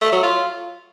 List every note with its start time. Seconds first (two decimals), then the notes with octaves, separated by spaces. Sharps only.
0.01 A3
0.12 F#3
0.23 F4